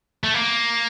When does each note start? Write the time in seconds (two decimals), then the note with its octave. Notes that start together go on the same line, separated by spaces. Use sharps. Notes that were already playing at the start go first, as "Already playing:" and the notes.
0.24 A3
0.34 A#3